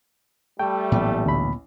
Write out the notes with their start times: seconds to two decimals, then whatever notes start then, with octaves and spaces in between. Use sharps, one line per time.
0.59 G3 A3 G5
0.92 A1 A#2 F#3 B3
1.26 D2 B5